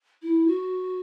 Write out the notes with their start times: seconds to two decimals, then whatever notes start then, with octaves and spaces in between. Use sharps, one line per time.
0.22 E4
0.47 F#4